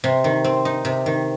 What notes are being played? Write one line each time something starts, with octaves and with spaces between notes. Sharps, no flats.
C3
D#3
C4
D#4
C3
D#3